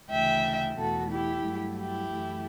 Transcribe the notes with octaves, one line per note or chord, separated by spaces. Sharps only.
D2 C#3 E3 A3 E5 G5
E2 B2 A3 F#4 A4
E4 G4
G2 F#3 A3
E4 G4
F#2 E3 A3